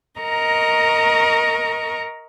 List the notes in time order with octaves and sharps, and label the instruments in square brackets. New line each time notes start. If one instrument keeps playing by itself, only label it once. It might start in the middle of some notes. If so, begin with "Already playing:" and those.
[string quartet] A#4 D#5 A#5 C#6